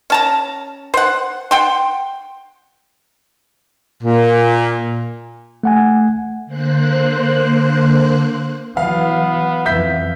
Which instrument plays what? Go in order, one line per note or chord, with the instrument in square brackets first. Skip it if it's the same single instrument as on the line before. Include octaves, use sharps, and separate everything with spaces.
[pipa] C#4 A5 A#5
C5 F#5
F#5 G5 C6
[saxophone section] A#2
[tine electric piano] A3 F#5 G#5
[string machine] D3 A#3 C5 F#6
[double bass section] E3 F#3 [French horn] B3 [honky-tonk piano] F5
[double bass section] F2 E3 [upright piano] E5 G6 B6